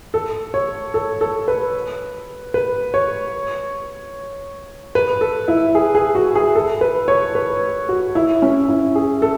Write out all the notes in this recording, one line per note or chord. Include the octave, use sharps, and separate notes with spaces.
A4
C#5
A4
A4
B4
B4
C#5
B4
A4
E4
G#4
G#4
F#4
G#4
A4
B4
C#5
B4
F#4
E4
C#4
E4
G#4
A4